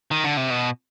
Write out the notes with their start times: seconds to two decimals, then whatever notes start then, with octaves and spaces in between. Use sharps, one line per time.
0.11 D#3
0.24 D3
0.37 C3
0.50 B2